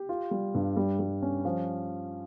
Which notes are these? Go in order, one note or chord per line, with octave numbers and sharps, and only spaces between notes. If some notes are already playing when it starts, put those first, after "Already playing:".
Already playing: G4
F4
G3
G2
G3
G3
C#4
F3